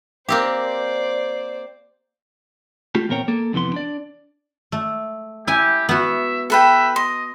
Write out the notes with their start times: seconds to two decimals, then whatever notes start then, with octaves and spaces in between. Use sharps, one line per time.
0.29 A#3 C4 G4 C5 D5
2.95 A3 F4 G4 A4
3.09 E2 A#2 C4 A#4 C#5 G5
3.28 A#3 A4
3.53 F2 C3 E3 B3 C6
3.73 D4 D5
4.72 A3
5.47 E4 G4 G#5
5.89 B3 F#4 E5
6.50 A4 B4 E5 G5
6.96 D#5 C6